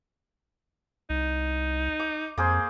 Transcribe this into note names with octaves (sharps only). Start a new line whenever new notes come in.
C2 D#4
D6
F2 A#3 G#4 C5